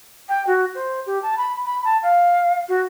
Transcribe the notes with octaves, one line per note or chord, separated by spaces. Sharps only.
G5
F#4
C5
G4
A5
B5
B5
A5
F5
F#4